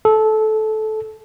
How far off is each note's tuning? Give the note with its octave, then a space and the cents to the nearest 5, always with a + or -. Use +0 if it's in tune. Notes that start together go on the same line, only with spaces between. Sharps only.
A4 -20